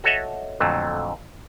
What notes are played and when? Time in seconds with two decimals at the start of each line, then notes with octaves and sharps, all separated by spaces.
0.04 F#4 A4 C#5 D#5 E5 F#5
0.60 F2 A#2 D3 F#3 A3